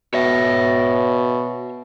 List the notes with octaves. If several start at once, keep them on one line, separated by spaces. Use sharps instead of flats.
B2 C#5 E5